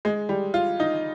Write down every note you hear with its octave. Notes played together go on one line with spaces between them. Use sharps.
G#3
G3
F4
D#4